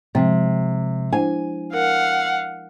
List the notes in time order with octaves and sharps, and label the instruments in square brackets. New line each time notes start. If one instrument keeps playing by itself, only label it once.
[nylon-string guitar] C3 [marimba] F3 G#3
[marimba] D4 E4 C5 [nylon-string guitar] G#5
[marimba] A#4 [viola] F5 F#5